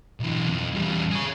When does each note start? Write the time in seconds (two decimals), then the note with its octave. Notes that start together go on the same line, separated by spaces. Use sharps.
0.20 B1 E3
0.50 F2
0.74 E2 G3
1.12 G#4 C#5